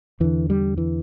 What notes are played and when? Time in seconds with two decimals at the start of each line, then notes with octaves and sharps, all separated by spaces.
0.20 E2 D3 E3
0.50 G3
0.78 E3